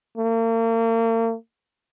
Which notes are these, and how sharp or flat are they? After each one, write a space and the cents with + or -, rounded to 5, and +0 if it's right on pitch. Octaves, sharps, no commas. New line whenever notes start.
A#3 -40